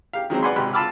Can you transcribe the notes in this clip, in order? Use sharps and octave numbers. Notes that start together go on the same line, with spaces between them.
G4 F5
D#3 F#3 G#3 C4
B4 D5 F#5 G#5 B5 C6
G#1 C3 B5 F#6
F4 A5 B5 D6 E6 F6